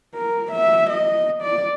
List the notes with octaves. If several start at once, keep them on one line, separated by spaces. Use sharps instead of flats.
A#4
E5
D#5
D5